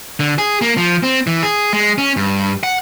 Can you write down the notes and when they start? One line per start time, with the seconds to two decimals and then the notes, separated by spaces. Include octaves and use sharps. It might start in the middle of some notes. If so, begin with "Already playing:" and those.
0.20 D3
0.38 G#4
0.61 A#3
0.77 F3
1.03 C4
1.27 E3
1.43 G#4
1.73 G#3
1.98 C#4
2.17 G2
2.63 F#5